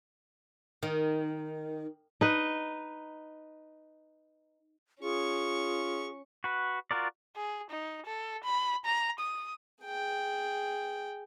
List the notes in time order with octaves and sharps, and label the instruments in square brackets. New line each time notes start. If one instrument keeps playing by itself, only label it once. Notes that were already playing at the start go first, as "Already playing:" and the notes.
[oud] D#3
[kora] D#4 B4
[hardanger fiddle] C#4 C#6 [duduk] F4 [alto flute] G#4
[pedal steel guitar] F#4 B4
F4 F#4 A#4 D5
[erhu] G#4
D#4
A4
B5
A#5
D#6
[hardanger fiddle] G#4 G5